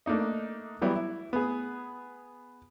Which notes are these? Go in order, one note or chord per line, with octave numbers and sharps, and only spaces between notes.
A3 A#3 D4 D#4 D#5
E3 F#3 G3 B3 E4
E4
B3 G#4